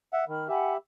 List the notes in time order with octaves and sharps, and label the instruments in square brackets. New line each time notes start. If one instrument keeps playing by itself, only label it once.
[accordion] E5 F#5
[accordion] D#3 [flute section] B5 F6
[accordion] G4 E5 [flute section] F#5 G#5 B5